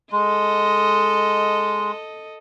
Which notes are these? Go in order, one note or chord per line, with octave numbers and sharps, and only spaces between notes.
G#3 A4 D#5